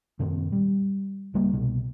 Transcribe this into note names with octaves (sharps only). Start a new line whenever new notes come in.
F#2 A#2 D#3 C4
G3
C#2 G3 A#3
C2 B2